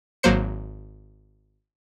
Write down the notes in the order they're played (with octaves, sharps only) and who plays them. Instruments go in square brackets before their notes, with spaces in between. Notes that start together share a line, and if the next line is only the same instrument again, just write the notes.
[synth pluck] G#1 F#3 A#3 C5 C#7